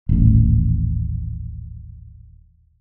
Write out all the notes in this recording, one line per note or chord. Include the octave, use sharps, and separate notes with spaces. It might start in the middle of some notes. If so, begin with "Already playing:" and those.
D#1 A1